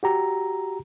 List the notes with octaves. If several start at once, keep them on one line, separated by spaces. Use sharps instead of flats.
F#4 G4 A#5